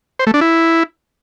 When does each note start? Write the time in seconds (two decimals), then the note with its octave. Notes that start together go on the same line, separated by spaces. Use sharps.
0.19 C5
0.27 A3
0.34 D4
0.41 E4